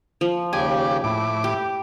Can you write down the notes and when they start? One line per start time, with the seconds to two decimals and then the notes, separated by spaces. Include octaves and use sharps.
0.21 F3
0.53 D#2 C#3 G4 D5 G#5
1.04 A2 E4 D6
1.44 G4